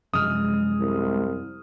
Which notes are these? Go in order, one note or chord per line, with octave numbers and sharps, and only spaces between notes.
F#2 C3 F3 G#3 D#6 F6
C2